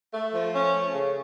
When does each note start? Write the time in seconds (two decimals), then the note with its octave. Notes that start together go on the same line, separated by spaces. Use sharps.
0.13 A3
0.33 F3
0.54 C#4
0.74 A3
0.93 C#3